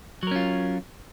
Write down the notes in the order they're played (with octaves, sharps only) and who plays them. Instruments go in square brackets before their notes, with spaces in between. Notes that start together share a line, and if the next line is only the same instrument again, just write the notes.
[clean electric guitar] F#3
A#4
C#4
F4